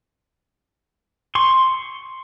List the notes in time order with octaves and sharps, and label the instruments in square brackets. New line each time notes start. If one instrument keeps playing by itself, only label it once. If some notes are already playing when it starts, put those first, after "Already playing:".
[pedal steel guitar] C6 C#6